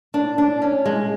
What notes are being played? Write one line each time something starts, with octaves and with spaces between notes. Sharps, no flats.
D4
D4
C#4
G#3